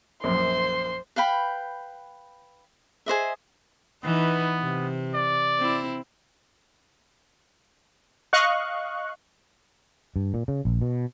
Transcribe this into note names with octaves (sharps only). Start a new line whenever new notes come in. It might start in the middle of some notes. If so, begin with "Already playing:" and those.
A#1 F#2 C5 C6
B4 F5 G5 B5
G#4 C5 D#5 E5
E3 B3 D#4
C3
D5
C4 E4
D#5 F5 C#6 F#6
G2
A#2
C#3
A#1
B2